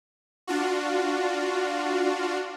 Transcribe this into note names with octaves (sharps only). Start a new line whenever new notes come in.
D4 F4 F#4